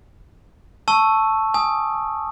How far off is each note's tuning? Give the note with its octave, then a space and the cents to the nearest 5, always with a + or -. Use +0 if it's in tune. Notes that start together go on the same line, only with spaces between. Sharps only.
A5 +0 C#6 -5 E6 +0
G#5 +0 D#6 +0